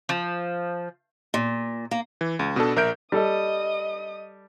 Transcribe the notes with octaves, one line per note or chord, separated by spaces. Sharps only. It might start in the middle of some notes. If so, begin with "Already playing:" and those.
F3
A#2
A#3
E3
C#2
B2 B3 D4 A4
A#1 A#4 E5 G6 D7
G3 A4 D#5 D#6